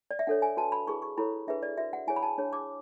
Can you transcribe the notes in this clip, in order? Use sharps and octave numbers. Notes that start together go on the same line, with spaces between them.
D5
E5
D4 A4 C#5 F#5
G#5
F#4 B4 A5
B5
E4 G#4 B4 C#6
C#6
E4 A4 C#5 B5
D4 G#4 B4 E5
D5
F#4 B4 E5
F#5
E4 G#4 C#5 G#5
B5
A5
D4 G#4 C#5
D6